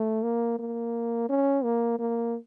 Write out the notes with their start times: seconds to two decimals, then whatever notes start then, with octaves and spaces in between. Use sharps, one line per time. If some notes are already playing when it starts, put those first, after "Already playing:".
Already playing: A3
0.23 A#3
0.59 A#3
1.29 C#4
1.64 A#3
1.99 A#3